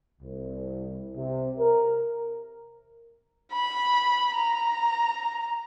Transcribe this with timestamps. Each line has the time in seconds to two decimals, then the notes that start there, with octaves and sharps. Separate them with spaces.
0.21 C2
1.16 C3
1.58 A#4
3.53 B5
4.35 A#5